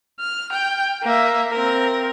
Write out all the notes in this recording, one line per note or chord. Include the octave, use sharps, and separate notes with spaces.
F6
G5
A#3 E5
C4 A#4